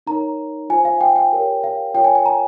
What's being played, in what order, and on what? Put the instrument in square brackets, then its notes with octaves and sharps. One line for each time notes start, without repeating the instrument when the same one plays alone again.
[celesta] D#4 A#4 C#5 A#5
F4 C5 G#5
F5
G5
G5
G4 A#4 C#5
F5
F4 A#4 C#5 G5
G#5
G#5
A#5